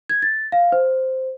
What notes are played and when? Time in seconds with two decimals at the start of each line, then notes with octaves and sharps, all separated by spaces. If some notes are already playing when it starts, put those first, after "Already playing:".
0.09 G#6
0.22 A6
0.52 F5
0.72 C5